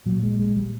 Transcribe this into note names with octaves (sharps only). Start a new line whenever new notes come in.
A#2 F#3
G#3
G#3
G3